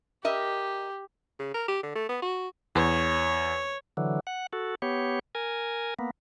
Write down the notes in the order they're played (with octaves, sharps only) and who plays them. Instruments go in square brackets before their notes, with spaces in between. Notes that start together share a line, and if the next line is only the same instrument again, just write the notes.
[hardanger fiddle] G4 [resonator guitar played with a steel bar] A#4 D#5 E5
[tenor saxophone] C#3
A#4
G4
D3
A3
B3
F#4
[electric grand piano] E2 [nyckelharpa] C#5
[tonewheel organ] D3 E3 F#3
F#5
F#4 A4
B3 G4 C#5
A#4 G#5
A#3 B3